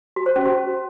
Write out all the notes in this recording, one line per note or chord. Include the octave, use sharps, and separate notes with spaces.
F#4
C5
C#4
F#4